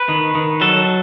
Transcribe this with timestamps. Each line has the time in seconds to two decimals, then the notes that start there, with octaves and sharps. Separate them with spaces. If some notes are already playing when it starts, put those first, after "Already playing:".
Already playing: B4
0.09 D#3
0.35 D#3
0.61 F#3 A4